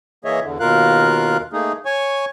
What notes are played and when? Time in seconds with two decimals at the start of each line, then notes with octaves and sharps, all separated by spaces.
0.25 E3 A#3 G#4 C#5 D#5 E5
0.42 E2 D3
0.60 D#2 B2 F4 A#4 F5 F#6
1.53 A3 A#3 D#4 G#4
1.85 C#5 G#5 C#6